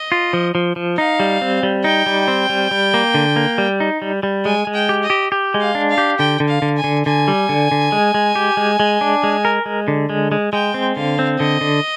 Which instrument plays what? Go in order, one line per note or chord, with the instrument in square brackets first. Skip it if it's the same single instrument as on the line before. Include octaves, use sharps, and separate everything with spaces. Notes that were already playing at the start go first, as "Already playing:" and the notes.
Already playing: [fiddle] D#5
[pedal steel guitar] F4
F3
F3
F3
[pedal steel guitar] D#4 [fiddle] F5
[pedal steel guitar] G3
C4
G3
[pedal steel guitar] D#4 [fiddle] G5
[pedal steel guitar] G3
C4
G3
G3
A#3
D3
A#3
G3
D#4
G3
G3
[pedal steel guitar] G#3 [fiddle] G#5
[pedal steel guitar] G#3
[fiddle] G5
[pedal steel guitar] G4
[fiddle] D#5
[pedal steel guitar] G4
G4
G#3
[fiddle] F5
[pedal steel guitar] D4
[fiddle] F5
[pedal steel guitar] G4
[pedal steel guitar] D3 [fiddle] G5
[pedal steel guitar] D3
[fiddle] F5
[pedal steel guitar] D3
[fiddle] G#5
[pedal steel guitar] D3
[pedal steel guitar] D3 [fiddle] G#5
[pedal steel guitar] G3
D3
D3
G#3
G#3
G4
G#3
G#3
D4
G#3
A#4
G#3
D3
G#3
G#3
[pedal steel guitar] G#3 [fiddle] G5
[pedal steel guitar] C4
[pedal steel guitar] D3 [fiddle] F5
[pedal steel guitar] C4
[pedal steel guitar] D3 [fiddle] D#5
[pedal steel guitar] D3